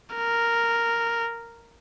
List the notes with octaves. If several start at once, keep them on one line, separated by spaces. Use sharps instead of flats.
A#4